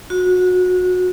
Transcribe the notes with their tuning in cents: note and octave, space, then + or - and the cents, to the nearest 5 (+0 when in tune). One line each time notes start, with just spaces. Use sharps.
F#4 -25